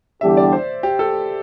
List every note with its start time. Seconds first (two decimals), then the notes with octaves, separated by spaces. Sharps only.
0.21 E2 D3 G3 D4 G4 E5
0.37 D5
0.53 C5
0.83 G4
0.99 A4